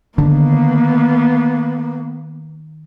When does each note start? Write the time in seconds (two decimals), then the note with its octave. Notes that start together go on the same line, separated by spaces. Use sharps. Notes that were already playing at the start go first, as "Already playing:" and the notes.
0.18 D3 D#3 A#3 B3